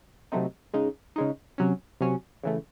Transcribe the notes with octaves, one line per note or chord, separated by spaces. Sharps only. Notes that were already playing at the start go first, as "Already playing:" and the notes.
C3 F#3 A3 C4 D#4
C#3 G#3 D#4
C#3 G#3 D#4
C3 F#3 C#4
C3 F#3 C#4
C#3 E3 A3